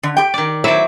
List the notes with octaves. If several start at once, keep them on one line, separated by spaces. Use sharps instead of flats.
D3
G4 G5
D#3 D5
F#3 E4 C5 D5 E5